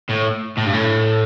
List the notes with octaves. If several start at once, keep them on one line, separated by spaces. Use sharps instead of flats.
A2
A2
G2
A2